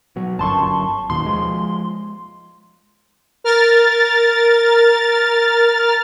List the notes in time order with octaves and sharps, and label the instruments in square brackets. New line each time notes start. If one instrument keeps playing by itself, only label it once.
[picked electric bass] B2 F#3
[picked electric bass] G1 F#2 [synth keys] A5 C6 C#6
[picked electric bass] D#2 B2 [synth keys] C6
[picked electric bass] F3 G#3
[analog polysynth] A#4 F6 A6